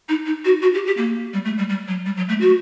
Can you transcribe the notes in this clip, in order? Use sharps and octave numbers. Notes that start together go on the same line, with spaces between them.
D#4
D#4
F#4
F#4
G4
G4
A#3
G3
A3
G3
G3
F#3
G3
F#3
A3
F#4